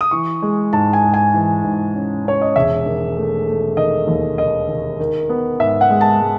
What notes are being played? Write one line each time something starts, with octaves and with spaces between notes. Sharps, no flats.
D#6
E3 C#6
G#3
G#2 A5
G#5
G#2
G#5
E3
G#2
C#4
C#4 C#5
D#5
E1 E5
D#3
A3
A3
D#3 D#5
D#2
D#3 D#5
D#3
D#3
B3
G#2 E5
F#5
G#3
A5
G#3